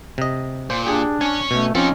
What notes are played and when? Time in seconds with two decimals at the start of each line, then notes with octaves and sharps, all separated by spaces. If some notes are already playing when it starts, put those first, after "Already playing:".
0.18 C3 D#5
0.70 A#2 C5
0.86 D4 G4 G#4
1.21 C#4 C#5 G#5
1.51 B2 A3
1.75 F3 C4 C#4 D#4 A4